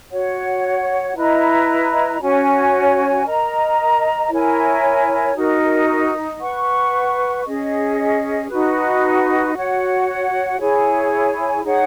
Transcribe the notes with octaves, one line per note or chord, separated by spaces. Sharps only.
F#4 C#5 F#5
E4 B4 D#5 A#5
C#4 F#4 C#5 G#5
A#4 D#5 A#5
E4 A#4 C#5 G#5
D#4 F#4 A#4
B4 F#5 C#6
C#4 G#4 D#5
D#4 F#4 B4
F#4 C#5 F#5
E4 G#4 C#5 G#5
D#4 G#4 C#5 F#5